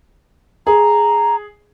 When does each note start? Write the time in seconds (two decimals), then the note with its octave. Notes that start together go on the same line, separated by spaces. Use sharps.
0.67 G#4 A#5